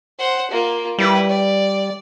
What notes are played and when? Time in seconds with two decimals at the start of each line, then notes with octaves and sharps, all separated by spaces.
0.19 C5 F#5
0.51 A#3 F4
0.98 G3 E4 B4
1.29 D5